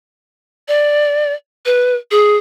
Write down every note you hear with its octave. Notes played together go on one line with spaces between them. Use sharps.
D5
B4
G#4